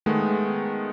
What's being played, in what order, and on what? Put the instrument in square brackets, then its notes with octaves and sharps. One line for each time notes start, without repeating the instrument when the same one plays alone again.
[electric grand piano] D#3 G#3 A3 B3